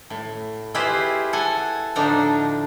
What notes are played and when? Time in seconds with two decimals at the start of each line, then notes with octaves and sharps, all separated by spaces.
0.10 A2
0.74 E4 F4 G4 G#4 B4 C5
1.33 A4 F#5 G#5
1.95 A2 D3 F3 D4 D#4 A#5